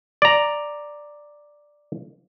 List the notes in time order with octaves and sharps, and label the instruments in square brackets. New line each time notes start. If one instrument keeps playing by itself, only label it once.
[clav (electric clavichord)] D5 A#5